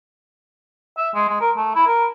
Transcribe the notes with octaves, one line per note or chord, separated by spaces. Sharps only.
E5
G#3
G#3
A#4
A3
E4
A#4